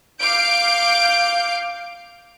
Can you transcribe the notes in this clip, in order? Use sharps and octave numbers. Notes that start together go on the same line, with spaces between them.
F5 D6 G6 D7